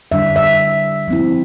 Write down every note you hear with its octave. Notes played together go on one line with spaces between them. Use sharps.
D3 G3 D4 E5
E5
F3 C4 E4